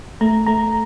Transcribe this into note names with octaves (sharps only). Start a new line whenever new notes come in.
A3 A#5
A3 A#5